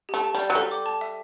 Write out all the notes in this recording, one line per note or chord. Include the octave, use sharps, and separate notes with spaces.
A3 G4
A5
G3
D5
F#3
G3 A4
D6
A5
E5